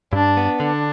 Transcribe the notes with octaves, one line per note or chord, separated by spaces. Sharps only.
G2 D4
B3
D3 D4